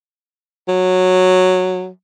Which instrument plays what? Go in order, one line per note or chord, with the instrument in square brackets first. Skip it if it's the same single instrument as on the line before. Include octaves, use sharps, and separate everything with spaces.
[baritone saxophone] F#3